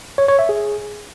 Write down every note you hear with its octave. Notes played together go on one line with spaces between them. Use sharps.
C#5
C#5
E5
G#4